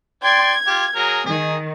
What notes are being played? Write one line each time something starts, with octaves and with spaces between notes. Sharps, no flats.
D5 G5 C6 G#6
F4 G4
F#3 G#4 A#4
D#3 G#4